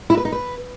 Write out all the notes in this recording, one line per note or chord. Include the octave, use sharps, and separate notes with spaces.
E4
B4
D#4
B4